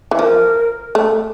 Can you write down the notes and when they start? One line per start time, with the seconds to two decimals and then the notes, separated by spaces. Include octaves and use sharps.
0.11 E3
0.19 F3 A#4
0.95 A3